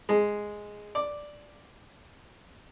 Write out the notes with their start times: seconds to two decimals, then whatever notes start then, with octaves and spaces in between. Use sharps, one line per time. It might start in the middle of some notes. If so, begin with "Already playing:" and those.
0.09 G#3
0.95 D5